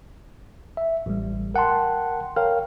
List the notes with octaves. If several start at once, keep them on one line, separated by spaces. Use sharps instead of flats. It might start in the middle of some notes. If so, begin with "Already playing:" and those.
E5
A1 G3
A#4 F#5 G5 A5 C6
A#4 C#5 F5 G5 F6